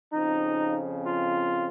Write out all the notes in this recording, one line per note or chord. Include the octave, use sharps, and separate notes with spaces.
F2 C#3 F3 C4 D#4
F4